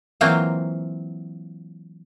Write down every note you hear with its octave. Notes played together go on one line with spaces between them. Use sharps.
E3 F#3 A#3 C4 F4